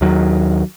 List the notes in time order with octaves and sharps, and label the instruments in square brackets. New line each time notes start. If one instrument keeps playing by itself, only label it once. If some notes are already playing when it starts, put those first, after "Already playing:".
[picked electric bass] D#2 D#3 F#3